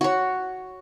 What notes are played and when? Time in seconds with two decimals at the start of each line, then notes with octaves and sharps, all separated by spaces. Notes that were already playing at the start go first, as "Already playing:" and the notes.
0.01 F#4 C#5